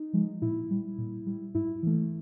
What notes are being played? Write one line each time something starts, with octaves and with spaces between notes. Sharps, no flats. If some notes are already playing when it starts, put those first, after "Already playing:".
Already playing: D#4
F3 G#3
A#2 E4
G3
A#2
G3
G#2 E4
E3 A3